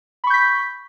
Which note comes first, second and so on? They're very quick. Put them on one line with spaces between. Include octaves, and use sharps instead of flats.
B5 C#6 G6 B6